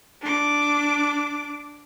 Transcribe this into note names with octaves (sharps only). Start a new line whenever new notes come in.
D4 D6